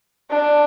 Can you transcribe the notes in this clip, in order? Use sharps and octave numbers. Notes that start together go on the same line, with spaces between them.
D4